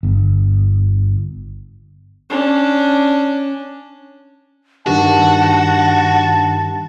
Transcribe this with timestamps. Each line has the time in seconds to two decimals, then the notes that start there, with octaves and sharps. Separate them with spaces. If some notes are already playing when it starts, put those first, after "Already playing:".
0.03 G1
2.30 C#4 D4
4.86 G2 D#3 D4 F#4 G4 A5